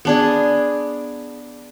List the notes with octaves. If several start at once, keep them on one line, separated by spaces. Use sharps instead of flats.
B3 D4 G#4